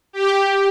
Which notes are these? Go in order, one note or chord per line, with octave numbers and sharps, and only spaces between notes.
G4